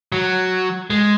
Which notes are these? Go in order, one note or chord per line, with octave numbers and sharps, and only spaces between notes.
F#3
G#3